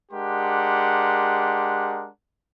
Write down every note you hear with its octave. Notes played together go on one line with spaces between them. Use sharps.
G#3 D4 G4 A#4 F#5 C6